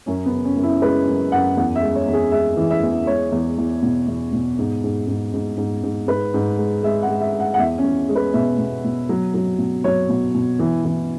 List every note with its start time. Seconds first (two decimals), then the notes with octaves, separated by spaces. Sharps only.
0.06 F#2 C#4
0.26 B3
0.32 C#3
0.44 C#4
0.56 F#2
0.63 E4
0.81 G#3 B4
1.08 F#2
1.32 F#2 F#5
1.57 E2 F#5
1.75 E5
1.82 G#3
1.95 C#5
2.08 E2
2.13 G#4
2.32 G#3 E5
2.57 E3
2.71 E5
2.83 E2
3.07 G#3 C#5
3.32 E2
3.58 E2
3.82 B2
4.08 E2
4.33 B2
4.59 G#2
4.84 G#2
5.08 G#2
5.33 G#2
5.58 G#2
5.83 G#2
6.08 G#2 B4
6.34 G#2
6.58 G#3
6.83 G#3 E5
7.03 F#5
7.08 G#3
7.21 E5
7.34 G#3
7.40 F#5
7.54 F#5
7.59 E2 E5
7.78 C#4
7.84 E2
8.09 G#3
8.15 B4
8.34 B2 E5
8.59 B2
8.84 B2
9.09 F#3
9.34 F#3
9.59 B2
9.84 F#3 C#5
10.09 B2
10.34 B2
10.59 E3
10.85 E3